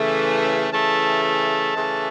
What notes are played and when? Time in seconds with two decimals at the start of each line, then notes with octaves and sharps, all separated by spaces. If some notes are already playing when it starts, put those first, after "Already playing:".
Already playing: C#3 E3 A3
0.70 C#3 E3 A3 A5
1.23 A5
1.75 C#3 E3 A3